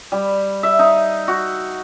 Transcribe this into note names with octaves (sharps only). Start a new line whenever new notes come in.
G3
E5
D#4
F#4